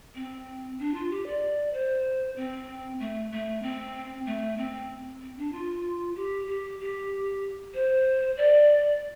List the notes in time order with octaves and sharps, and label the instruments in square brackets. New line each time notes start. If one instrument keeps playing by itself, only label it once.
[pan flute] C4
D4
F4
G4
D5
C5
C4
A3
A3
C4
A3
C4
C4
D4
F4
G4
G4
G4
C5
D5